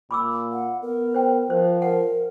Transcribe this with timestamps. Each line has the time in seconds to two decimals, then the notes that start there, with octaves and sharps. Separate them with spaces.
0.11 A#2 B5 D6 E6
0.52 F#5
0.82 B3 A#4
1.14 C5 G5
1.50 F3 C5
1.82 A#4 F#5